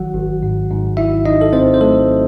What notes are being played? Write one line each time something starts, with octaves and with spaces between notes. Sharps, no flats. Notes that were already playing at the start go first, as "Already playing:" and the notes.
Already playing: G#1 D#3 F#3 F#4 F#5
G#1
G#2
G#2
G#1 E4 E5
G#1 D#4 D#5
A4
G#2 C4 C5
C5
F#3 A3 A4